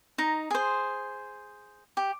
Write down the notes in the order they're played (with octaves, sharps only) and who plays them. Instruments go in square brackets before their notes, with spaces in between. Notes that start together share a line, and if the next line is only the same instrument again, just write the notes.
[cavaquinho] D#4 A#5
G#4 C5
G4